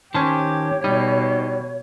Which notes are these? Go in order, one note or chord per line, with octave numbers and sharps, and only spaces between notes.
D#3 C#4 G4 C5 C#5 A5
B2 G3 D#4